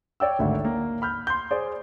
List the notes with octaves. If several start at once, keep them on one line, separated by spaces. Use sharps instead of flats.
C#5 D5 G5 E6
G#1 D2 E5
A#3
B5 F6 G6
C6 G6
G#4 C5 D5